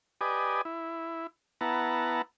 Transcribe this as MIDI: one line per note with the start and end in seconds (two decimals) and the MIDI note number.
0.21 0.61 67
0.21 0.61 71
0.21 0.61 74
0.21 0.61 75
0.21 0.61 80
0.65 1.27 64
1.61 2.22 59
1.61 2.22 64
1.61 2.22 78
1.61 2.22 81
1.61 2.22 82